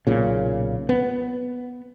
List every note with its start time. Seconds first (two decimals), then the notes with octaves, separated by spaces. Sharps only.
0.07 B1 A#2 C#3
0.89 B3